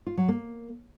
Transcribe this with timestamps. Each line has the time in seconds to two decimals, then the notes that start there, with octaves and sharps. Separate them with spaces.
0.07 F4
0.17 F#3
0.28 A#3